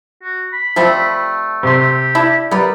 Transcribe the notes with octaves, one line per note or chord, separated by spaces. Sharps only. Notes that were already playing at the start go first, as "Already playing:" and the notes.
F#4
B5
F3 G3 A3 C4
C3 G4 C6
D4 E4
G3 B3 A#4 B4 D5